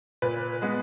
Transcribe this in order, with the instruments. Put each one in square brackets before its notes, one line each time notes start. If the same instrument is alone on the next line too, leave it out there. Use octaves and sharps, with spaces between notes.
[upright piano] A#2 B4
G#3 B3